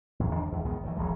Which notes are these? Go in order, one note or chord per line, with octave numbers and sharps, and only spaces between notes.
E2 A#2
D#3 D4
E2 G#2
A#1 G#2 D#3 B3
D#2 D#3 E3
E1 A1 F3 G#3